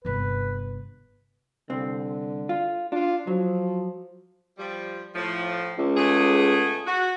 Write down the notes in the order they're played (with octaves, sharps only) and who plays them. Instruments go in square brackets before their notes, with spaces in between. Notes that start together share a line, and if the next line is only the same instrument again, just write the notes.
[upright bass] G1 C3 [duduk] B4
[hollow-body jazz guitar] C2 C4 [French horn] D3
[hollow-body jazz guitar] F4
[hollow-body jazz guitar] D4 [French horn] F4
[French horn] F3 [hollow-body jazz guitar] F#3
[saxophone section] F3 G3
A2 F3
[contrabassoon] C#2
[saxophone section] A3 B3 G#4
F#4